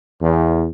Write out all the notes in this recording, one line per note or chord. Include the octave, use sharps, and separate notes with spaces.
E2